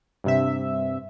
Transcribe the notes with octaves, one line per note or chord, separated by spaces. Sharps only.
G2 C3 E5